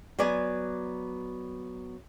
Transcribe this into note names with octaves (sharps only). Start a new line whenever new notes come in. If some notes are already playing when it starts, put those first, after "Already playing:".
F#3 B3 D5 G#5